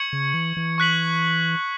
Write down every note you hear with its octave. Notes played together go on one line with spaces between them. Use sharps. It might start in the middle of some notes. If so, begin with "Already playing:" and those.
Already playing: C#6 G#6 C#7 F#7
C#3
E3
E3
C#6 F#6 B6 F#7